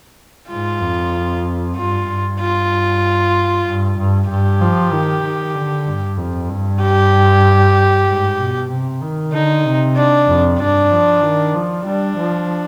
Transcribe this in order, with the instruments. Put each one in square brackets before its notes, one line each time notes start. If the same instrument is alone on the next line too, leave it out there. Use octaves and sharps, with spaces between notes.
[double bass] G#2 [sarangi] F4
[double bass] F2
[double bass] G2 [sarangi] F4
[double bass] G2
[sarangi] F4
[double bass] G2
G2
[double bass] G2 [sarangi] G4
[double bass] F3
D#3
D#3
D3
G2
F2
G2
[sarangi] G4
[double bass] G#2
B2
C3
D#3
[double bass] D3 [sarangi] D#4
[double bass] C3
[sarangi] D4
[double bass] F2
[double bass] G2 [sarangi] D4
[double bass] F3
D#3
F3
[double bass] G3 [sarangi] D4
[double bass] F3